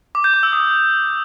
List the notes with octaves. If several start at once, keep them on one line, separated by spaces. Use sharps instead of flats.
D6
G6
D6
E6
D#6